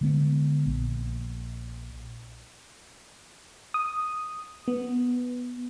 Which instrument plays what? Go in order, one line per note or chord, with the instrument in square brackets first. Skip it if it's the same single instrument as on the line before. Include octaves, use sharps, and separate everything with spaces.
[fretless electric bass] D3 G#3 B3
A#1
[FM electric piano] D#6
B3